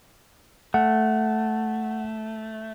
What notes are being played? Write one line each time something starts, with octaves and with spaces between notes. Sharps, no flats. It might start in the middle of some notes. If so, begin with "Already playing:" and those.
A3 F#5